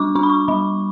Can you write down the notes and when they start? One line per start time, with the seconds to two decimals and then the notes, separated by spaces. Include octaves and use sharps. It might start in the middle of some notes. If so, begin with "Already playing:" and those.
Already playing: G3 D4 C#6 D6
0.15 D4 C#6
0.23 B5
0.30 C#6
0.48 G3 B5